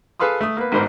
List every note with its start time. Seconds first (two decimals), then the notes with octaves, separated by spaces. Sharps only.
0.20 G#4 A4 B4 F5 C6 D#6
0.41 A3 D#6
0.57 A#3 B3 B4
0.72 A1 G#2 F#4 A#4 C5 B5